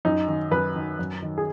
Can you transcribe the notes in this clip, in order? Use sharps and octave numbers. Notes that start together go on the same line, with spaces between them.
F#2 D#4
D#3
F#2 B4
D#3
F#2
D#3
G#4